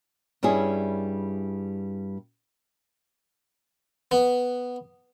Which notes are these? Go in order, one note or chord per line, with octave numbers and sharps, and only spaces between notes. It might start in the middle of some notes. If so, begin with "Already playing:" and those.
G2 G3 C#4 E4 G#4
B3